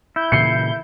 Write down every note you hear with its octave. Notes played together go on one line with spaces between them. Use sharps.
E4 G6
A#2 C#3 E3 C7 C#7